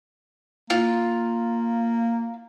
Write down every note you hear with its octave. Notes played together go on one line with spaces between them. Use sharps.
A#3 F4